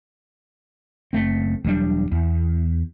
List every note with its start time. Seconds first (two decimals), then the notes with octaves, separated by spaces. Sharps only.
1.13 F#1 A3 C4
1.64 E1 F#3 G3 D4
2.12 E2